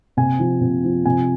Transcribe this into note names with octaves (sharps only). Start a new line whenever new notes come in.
C3 G#5
F3
C3
F3
C3 G#5